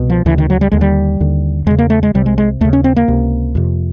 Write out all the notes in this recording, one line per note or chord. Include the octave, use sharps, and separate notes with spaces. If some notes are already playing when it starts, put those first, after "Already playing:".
Already playing: C2 B2
F3
D2 C#3 E3
D#3
F#3
G3
D#2 D3 G#3
G3
D#2 D3
E2 C#3 G#3
A#3
A3
G#3
C2 C3 G3
G#3
G#3
D#2 C#3 A3
C#4
C4
A#3
C#2 C3
F2 C3